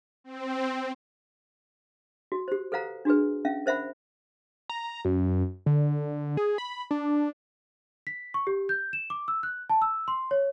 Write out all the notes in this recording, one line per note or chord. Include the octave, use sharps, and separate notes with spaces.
C4
F#4
G4 C5
A4 B4 C5 F5 F#5 A#5
D4 F#4 G#4 B4
C#4 E5 F5
A#4 C5 E5 F#5 B5
A#5
F#2
D3
G#4
B5
D4
B6
C#6
G4
G6
E7
D6
E6
F#6
A5
E6
C6
C#5